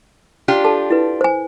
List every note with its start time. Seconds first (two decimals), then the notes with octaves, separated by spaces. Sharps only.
0.48 D4 F4 G4
0.64 A4 A5
0.90 E4 B4
1.21 C5 G#5